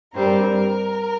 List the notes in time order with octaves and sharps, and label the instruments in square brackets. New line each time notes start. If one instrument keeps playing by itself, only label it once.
[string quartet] G2 G3 C4 A#4